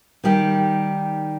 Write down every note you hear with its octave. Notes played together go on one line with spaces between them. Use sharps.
D#3 G3 D#4 G4